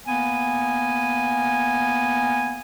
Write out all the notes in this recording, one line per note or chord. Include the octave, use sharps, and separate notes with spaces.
A#3 B3 G#5